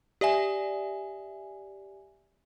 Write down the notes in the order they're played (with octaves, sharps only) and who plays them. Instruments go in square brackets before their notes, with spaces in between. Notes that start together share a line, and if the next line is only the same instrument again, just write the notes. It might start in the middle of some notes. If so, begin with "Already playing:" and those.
[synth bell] G4 D5 E5 G#5